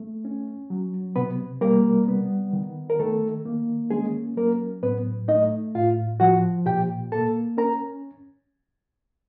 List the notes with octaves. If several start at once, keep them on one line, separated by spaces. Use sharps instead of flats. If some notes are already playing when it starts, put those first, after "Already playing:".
Already playing: A3
C#4
F#3
C3 B3 B4
G3 A#3 A#4
B3
D#3
A#4
D#3 A3 A4
A#3
G#3 C#4 G#4
F#3 A#3 A#4
A2 B3 B4
A3 D#4 D#5
A2 F4 F5
F3 F#4 F#5
A#2 G4 G5
A#3 A4 A5
C#4 A#4 A#5